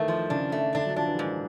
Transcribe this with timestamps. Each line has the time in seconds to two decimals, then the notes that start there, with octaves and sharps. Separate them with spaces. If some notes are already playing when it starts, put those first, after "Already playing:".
Already playing: D#3 E3 A3
0.08 F3
0.30 C#3 D4
0.52 A3
0.75 D3 D4
0.86 F#3
0.96 F3 D4
1.08 E3
1.19 G#2 D#3